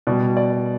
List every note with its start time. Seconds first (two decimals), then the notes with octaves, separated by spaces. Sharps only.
0.07 B2 G3 D5
0.37 D5